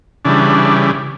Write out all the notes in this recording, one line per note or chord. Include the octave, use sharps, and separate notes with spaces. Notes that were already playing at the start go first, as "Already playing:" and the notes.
C#3 E3 G3 D4